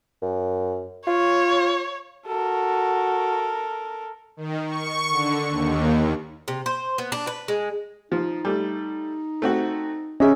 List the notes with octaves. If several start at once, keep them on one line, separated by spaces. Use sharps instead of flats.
F#2
F4 C#5
F#4 A4 A#4
D#3
C#6
D3
D#2
C3
C5
B3
D4
B4
G#3
F3 D#4
G3 A3
A3 C4 F#4
C#4 G#4 D#5 E5